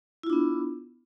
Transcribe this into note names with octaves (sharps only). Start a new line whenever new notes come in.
B3 D4 E4 F4